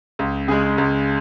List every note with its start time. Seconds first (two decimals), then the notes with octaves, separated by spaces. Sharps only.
0.19 C#2
0.48 C#3 G#3 G#4
0.78 C#2